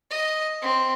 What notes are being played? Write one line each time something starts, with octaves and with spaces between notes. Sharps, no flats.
D#5
C4